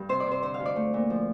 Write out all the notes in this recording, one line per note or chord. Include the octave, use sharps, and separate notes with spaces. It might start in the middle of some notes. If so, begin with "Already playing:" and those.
Already playing: G2
C3 C5
D5
C3
C5
D3 C5
F5
D2
D5
A3
A#2
F3